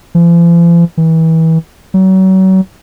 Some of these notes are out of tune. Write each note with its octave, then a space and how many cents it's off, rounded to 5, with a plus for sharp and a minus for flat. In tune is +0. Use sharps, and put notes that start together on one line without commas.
F3 -45
E3 -30
F#3 +35